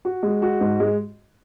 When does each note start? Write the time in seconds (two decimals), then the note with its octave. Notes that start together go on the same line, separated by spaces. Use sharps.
0.05 F#4
0.23 G#3
0.42 F#4
0.61 G#2
0.80 G#3